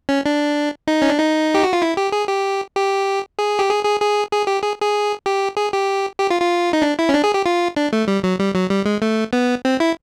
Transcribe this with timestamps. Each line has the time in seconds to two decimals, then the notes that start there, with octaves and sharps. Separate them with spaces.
0.09 C#4
0.26 D4
0.87 D#4
1.02 C#4
1.10 D4
1.19 D#4
1.54 G4
1.63 F#4
1.73 F4
1.82 E4
1.97 G4
2.12 G#4
2.28 G4
2.76 G4
3.39 G#4
3.59 G4
3.69 G#4
3.85 G#4
4.01 G#4
4.32 G#4
4.47 G4
4.63 G#4
4.82 G#4
5.26 G4
5.57 G#4
5.73 G4
6.20 G4
6.30 F4
6.41 F4
6.73 D#4
6.82 D4
6.99 E4
7.09 C#4
7.14 D4
7.24 G#4
7.34 G4
7.46 F4
7.76 D4
7.93 A3
8.08 G3
8.24 F#3
8.39 G3
8.55 F#3
8.70 G3
8.85 G#3
9.02 A3
9.33 B3
9.65 C4
9.80 E4